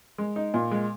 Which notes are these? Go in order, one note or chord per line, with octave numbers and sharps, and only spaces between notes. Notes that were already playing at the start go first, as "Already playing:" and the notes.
G#3
D#4
A#2
G#3